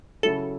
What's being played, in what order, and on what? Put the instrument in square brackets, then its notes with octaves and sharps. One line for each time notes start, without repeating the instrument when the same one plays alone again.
[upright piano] C#3 F#3 C#4 E4 [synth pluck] A4